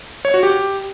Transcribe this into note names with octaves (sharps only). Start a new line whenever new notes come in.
C#5
F#4
G4